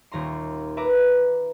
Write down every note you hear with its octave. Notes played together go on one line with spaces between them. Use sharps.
D#1 D#2 A#5 C6
B4 E5 A#5 D6